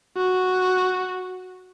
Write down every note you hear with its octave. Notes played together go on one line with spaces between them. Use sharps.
F#4